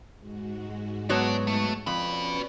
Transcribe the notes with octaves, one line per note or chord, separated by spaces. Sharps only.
G#2 G#3 F#4
F#3 B3 C#5 D5 A5
A3
F2 C#4 F#4 B4 D5 B5